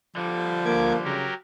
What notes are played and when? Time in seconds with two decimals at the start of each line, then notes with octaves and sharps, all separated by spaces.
0.16 D3 F3 G3
0.65 D2 A#3 D6 G#6
1.05 C#3 F#3 G4 A#4